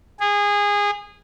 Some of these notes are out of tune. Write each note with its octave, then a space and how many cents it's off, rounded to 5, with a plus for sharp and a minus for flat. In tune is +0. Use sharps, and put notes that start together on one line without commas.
G#4 -20